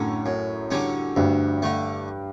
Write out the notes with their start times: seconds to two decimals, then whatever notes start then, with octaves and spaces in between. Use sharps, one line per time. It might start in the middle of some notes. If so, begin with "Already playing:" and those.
Already playing: F#2 A2 D3 C#4
0.26 F#2
0.71 D3 G3 C#4
1.16 D2 G2
1.62 D3 A3